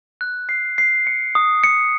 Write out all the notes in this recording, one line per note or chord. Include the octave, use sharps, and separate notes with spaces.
F#6
C7
C7
C#7
D#6
C#7